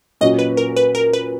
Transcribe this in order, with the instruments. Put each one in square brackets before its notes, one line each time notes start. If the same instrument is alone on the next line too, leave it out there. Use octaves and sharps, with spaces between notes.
[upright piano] A#2 F#3 C#4 F#4 [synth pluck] D#5
[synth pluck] B4
A#4
B4
A#4
B4